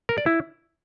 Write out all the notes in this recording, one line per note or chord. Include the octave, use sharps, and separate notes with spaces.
A#4
D5
E4